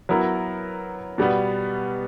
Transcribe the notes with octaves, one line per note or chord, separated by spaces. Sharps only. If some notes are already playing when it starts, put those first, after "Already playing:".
F#3 B3 E4 A#4
B2 G3 B3